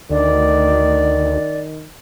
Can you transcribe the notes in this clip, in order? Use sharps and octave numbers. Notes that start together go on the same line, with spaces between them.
D2 D#3 D5